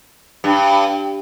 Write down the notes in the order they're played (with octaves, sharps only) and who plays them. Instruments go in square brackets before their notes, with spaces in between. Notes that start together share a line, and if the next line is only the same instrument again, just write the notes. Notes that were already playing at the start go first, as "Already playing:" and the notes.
[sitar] G2